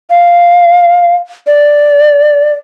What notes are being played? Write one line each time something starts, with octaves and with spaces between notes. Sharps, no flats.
F5
D5